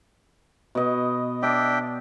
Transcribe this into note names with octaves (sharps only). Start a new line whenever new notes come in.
B2 D#5
D4 D5 E5 G5